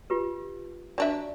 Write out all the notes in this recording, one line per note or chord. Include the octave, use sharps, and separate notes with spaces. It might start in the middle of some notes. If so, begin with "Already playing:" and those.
F4 G4 B4
F#3 D4 D5 E5